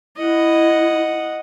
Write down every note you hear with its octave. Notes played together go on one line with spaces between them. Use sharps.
E4 D#5 F#5